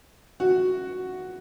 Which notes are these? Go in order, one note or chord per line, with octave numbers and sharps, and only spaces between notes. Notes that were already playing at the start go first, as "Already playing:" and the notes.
F#4